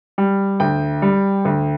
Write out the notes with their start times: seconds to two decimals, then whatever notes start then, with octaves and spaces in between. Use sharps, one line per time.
0.18 G3
0.60 D2 G5
1.02 G3
1.45 D2